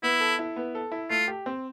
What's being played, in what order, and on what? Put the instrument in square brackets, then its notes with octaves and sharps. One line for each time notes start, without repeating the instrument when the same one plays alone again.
[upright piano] B3 [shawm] E4
[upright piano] A4
E4
B3
A4
E4
[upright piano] A3 [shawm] F4
[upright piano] G4
C4